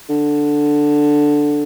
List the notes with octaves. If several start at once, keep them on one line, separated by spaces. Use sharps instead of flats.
D3